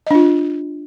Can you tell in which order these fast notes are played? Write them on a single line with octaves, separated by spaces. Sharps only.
D#5 D4 F4